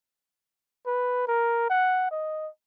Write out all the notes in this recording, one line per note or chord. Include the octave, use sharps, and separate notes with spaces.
B4
A#4
F#5
D#5